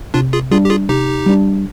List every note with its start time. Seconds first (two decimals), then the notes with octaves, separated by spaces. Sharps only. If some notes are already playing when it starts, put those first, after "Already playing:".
0.14 C3 D4 F4
0.33 F4 G#4
0.51 G3 D4 F4 G#4
0.65 G4
0.70 F4 G#4
0.89 C3 D#4 G4
1.26 G3 D4